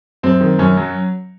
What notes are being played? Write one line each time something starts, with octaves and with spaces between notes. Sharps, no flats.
F#2 C4
D#3
F#2 C#4
F#3